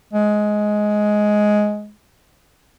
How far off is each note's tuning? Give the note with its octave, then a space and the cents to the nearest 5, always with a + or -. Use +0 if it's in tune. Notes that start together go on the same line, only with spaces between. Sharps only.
G#3 +10